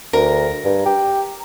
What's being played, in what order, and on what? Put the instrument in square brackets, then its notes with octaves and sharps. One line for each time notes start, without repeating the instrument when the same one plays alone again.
[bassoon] D2 [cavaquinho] A#4
[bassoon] G2
G4